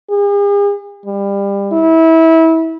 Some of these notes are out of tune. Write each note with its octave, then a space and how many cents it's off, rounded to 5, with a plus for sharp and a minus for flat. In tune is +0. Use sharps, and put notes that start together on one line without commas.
G#4 -45
G3 +25
E4 -25